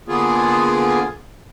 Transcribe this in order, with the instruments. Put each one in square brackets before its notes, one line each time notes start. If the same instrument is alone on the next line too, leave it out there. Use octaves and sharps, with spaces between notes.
[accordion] D3 A#3 B3 F4 G#4